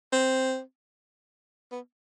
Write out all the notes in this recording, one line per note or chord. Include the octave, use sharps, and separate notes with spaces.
C4
B3